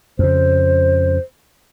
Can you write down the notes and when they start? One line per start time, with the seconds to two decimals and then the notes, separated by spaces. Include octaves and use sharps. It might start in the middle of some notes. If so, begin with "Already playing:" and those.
0.19 F2 C#3 C5